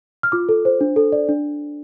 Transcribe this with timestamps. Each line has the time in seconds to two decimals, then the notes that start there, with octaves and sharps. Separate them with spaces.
0.23 F6
0.32 F4 D6
0.49 A4
0.65 C5
0.81 D4
0.96 A4
1.12 D5
1.29 D4